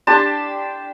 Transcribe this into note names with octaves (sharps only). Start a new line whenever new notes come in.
D4 G4 A5 C6